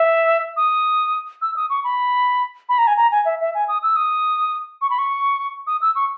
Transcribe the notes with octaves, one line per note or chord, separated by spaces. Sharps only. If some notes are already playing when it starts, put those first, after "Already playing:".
Already playing: E5
D#6
E6
D#6
C#6
B5
B5
A#5
G#5
A#5
G#5
E5
E5
G#5
D#6
E6
D#6
C#6
B5
C#6
D#6
E6
C#6